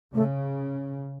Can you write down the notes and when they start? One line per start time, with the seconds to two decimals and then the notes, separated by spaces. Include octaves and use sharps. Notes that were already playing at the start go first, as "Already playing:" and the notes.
0.15 C#3 A3